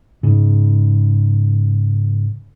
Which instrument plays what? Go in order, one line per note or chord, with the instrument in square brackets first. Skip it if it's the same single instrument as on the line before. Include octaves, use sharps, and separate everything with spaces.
[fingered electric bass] G#2 C#3